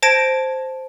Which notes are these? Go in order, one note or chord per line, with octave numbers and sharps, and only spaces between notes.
C5 A5 G#6 A#6 D7